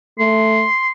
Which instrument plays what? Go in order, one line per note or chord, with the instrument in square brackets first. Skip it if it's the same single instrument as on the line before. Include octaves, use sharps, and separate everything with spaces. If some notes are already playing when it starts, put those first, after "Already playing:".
[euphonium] A3 [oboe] C6